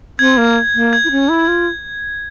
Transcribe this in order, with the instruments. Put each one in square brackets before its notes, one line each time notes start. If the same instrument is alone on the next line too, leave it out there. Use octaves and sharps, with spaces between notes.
[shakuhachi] C4 [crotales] G#6
[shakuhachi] A#3
A#3
[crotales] G#6
[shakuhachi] E4
C#4
E4
F4